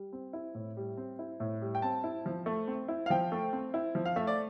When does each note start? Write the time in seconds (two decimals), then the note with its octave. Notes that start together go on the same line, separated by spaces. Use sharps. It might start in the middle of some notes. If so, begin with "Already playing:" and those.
Already playing: G3
0.13 C4
0.33 E4
0.55 A2
0.77 G3
0.97 C4
1.19 E4
1.40 A2
1.62 G3
1.75 G5
1.82 C4 A5
2.04 E4
2.26 F3
2.46 A3
2.67 C4
2.88 E4
3.06 F5
3.10 F3 G5
3.32 A3
3.53 C4
3.74 E4
3.95 F3
4.05 F5
4.16 A3 E5
4.27 D5